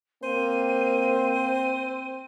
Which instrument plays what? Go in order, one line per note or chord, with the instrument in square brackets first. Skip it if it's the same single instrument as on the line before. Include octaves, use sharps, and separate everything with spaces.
[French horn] A#3 [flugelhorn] C4 [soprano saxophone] C5 [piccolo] D#7